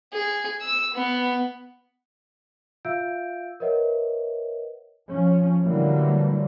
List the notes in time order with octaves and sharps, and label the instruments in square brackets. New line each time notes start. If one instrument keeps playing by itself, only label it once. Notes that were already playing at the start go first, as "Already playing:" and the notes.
[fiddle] G#4
E6
B3
[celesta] F4 E5 F5 E6 G6 D7
A#4 B4 C#5 D#5 E5 F#5
[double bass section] F3 C#4
A2 D3 E3 F#3 G3 A#3